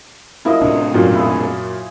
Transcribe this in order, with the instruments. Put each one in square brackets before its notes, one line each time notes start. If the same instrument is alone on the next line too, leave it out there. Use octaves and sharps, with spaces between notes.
[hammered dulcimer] F3 F#3 D#5 [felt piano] A#3 E4
[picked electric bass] A2 C3 D4
[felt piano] F#2 A#2 A#3
[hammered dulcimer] E4 F4 G#4